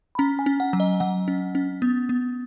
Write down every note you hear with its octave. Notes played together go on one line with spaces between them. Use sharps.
B5
C#4 A#5
G#5
C#4
F#5
F#3
D#5
F#3 F#5
C#4
C#4
B3
B3